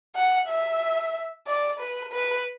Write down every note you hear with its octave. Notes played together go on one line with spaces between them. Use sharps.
F#5
E5
D5
B4
B4